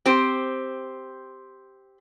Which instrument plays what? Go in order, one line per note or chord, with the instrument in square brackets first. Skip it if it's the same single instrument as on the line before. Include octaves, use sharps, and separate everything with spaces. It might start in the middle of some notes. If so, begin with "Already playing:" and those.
[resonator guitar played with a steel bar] C4 G4 C5